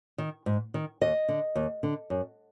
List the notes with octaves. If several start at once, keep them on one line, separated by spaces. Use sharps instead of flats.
D#3
G#2
D#3
D#2 D#5
D3
D#2
D3
F#2